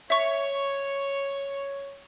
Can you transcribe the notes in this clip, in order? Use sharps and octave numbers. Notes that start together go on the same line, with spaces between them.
C#5 E5 C#6